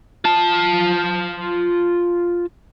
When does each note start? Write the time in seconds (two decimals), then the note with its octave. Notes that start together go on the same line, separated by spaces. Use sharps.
0.25 F4 A5